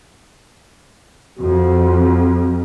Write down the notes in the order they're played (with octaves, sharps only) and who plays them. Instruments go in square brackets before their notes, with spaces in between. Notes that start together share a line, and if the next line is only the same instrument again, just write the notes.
[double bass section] F2 [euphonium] F#4